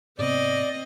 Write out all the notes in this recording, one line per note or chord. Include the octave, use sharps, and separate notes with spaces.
G#2 C3 B3 C4 D5 D#5